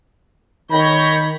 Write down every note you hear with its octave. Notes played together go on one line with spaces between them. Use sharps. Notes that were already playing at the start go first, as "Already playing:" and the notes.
D#3 C#5 B5 G6 A#6